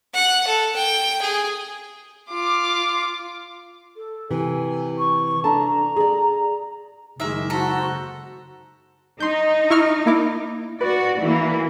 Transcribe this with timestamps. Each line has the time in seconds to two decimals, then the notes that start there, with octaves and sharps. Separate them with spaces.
0.14 F#5
0.47 A4
0.76 G5
1.21 G#4
2.31 F4 D6
3.96 A4
4.31 C3 E3 G#5
4.98 C#6
5.44 D4 A4 A5 A#5
5.96 G#4 D5
7.20 F#1 D#3 G#3 A#3 E5
7.50 F#4 A4 C5 A#5
9.20 D#4 C6 G6
9.70 E4 C#6 F6
10.06 A#3 E4 D6
10.81 F#4 B4 D5
11.20 E3 A#3